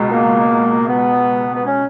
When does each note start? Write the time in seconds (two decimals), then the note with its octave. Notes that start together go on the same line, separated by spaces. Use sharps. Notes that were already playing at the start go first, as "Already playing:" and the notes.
Already playing: C#2 B2
0.10 A#3
0.87 B3
1.54 B3
1.65 C#4